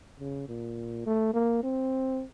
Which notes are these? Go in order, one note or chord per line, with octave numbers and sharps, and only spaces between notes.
C#3
A#2
A3
A#3
C4